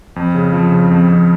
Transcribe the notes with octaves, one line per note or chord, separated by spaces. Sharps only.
F2
C#3
F3
C#3
F2
F2